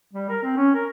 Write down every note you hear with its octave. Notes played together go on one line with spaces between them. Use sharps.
G3
A#4
C4
C#4
A#4